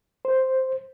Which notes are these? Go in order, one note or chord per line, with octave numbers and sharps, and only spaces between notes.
C5